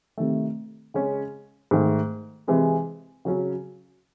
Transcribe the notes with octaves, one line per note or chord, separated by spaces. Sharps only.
C3 D#3 A3
C#3 G#3 C#4
G#2 D#3 A3
C3 E3 G#3
C#3 F#3 C#4